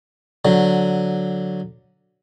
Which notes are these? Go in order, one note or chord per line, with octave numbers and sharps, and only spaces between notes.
D3 F#3